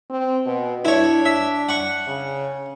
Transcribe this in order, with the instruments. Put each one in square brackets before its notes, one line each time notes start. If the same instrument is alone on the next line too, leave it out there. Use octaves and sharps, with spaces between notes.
[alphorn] C4
B2
[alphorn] D4 [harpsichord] E4 C#5
[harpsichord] E5
F#5 C#6
[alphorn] C#3